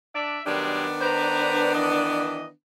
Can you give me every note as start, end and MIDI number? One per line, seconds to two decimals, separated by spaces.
0.14 0.39 62
0.14 0.39 74
0.14 0.39 76
0.45 0.86 42
0.45 2.50 51
0.45 0.86 55
0.45 0.86 56
0.45 2.50 59
0.45 2.50 62
1.02 1.71 71
1.02 1.71 72
1.02 1.71 82
1.74 2.44 52
1.74 2.44 75